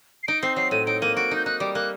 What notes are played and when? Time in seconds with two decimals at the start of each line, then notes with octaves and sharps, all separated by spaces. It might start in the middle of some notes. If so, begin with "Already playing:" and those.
0.23 C7
0.27 D#4 D7
0.42 C4 C7
0.56 F#3 C7
0.71 A2 D#7
0.87 D#4 D7
1.01 A#3 D#7
1.16 F#4 D7
1.31 D#4 G6
1.45 D#4 F#6
1.60 G3 D6
1.75 A#3 F#6